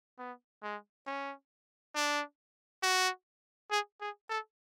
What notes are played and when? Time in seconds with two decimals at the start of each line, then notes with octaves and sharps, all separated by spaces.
0.19 B3
0.63 G#3
1.06 C#4
1.95 D4
2.83 F#4
3.71 G#4
4.01 G#4
4.30 A4